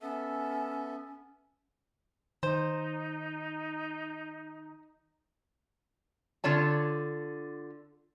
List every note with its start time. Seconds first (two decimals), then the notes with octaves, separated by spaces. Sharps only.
0.02 B3 C#4 A4 E5
2.43 D#3 D#4 C5
6.44 D3 F4 C#5 A5